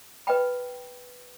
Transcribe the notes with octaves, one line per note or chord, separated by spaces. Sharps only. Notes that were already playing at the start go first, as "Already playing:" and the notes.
B4 D#5 G5 B5